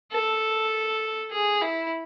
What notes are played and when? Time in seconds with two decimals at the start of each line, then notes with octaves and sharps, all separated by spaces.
0.12 A4
1.31 G#4
1.61 E4